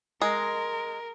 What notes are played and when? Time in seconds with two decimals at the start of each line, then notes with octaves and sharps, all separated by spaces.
0.22 G#3 A#4